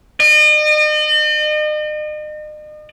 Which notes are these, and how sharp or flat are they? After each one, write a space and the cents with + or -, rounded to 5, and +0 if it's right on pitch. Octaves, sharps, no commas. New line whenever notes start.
D#5 -40